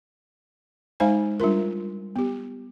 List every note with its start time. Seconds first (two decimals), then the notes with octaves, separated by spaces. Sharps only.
1.00 G#3 D#4 C5 F5 G#5
1.40 G3 D4 F4 A#4
2.16 B3 G4